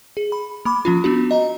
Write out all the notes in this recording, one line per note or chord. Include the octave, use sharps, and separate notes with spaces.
G#4
B5
A#3 B5 D6
F3 C#4 F4
B3 D4 F#4
D#5 A#5